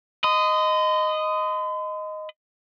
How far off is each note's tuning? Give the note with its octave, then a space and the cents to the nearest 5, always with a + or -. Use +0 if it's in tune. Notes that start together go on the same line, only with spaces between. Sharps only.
D#5 +0 C6 -45